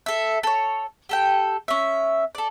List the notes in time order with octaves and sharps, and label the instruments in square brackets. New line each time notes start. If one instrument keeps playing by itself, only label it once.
[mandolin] A4 E5
A4 C#5
G4 A4 G5
C#4 E5
A4 D5